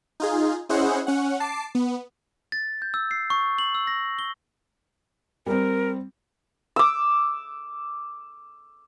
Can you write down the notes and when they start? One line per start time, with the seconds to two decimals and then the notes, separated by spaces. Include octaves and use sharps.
0.20 D#4 F4 G#4
0.69 C#4 E4 G#4 C5 D#5 F#5
1.07 C#4 F#5
1.40 A5 D6 C7
1.75 B3
2.52 A6
2.82 G6
2.94 E6
3.11 C7
3.30 C#6
3.58 F#7
3.75 E6
3.87 A#6
4.19 G7
5.46 G3 C4 A#4
6.76 D6 E6